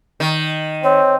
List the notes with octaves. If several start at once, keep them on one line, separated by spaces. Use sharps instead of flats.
D#3
C4 C#5